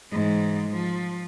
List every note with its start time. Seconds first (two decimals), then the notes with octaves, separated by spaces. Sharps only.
0.11 G#2 E3
0.69 F3